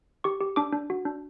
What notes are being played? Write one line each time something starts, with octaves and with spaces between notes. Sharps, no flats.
G4 C#6
G4
D4 D6
D4
F#4
D4